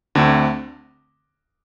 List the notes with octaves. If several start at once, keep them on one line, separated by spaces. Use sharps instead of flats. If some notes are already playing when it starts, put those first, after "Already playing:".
D2 D3 A3 C4